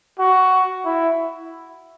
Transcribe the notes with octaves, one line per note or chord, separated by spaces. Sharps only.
F#4
E4